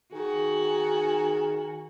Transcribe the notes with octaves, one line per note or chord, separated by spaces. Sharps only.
D#3 F#4 G#4 G#5